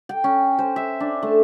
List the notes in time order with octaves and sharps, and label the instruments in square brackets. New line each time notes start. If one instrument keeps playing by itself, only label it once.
[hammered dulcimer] G5
C#4
C5
E5
D4
A3